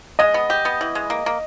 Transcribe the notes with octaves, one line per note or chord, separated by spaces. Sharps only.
G#3 D#5
B3
G4
B3
E3
G#3
A#3
A#3